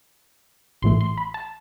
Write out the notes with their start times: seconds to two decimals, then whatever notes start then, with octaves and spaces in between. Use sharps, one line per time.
0.82 A1 A2 E3 A3 C6
1.01 C6
1.18 B5
1.34 A5